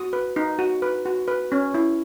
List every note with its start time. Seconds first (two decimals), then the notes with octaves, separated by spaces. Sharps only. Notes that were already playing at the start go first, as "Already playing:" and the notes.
Already playing: F#4 D#6
0.13 B4
0.36 D#4
0.59 F#4
0.82 B4
1.06 F#4
1.28 B4
1.52 C#4
1.74 E4